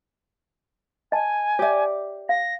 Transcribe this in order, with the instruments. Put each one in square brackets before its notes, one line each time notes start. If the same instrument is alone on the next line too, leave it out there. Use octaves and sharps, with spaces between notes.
[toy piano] D#5 A5 [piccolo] G#5
[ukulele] G4 D5 [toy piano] C#5 E5
[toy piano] F5 [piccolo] A#6